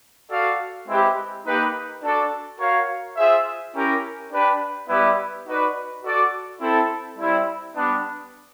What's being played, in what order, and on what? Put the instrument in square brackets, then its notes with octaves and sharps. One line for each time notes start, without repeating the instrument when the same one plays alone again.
[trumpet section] F#4 A4 D5 F5
G#3 C4 E4 G4 B4
A#3 D#4 G4 B4
D4 F#4 A4 D5
F#4 A#4 C#5 F5
F4 G#4 C5 E5
C#4 E4 G4 A#4
D4 G4 B4
G3 B3 E4 G4 B4
D#4 F#4 B4 D5
F#4 A4 D5
C4 E4 A4
G3 C4 E4
G3 B3 D4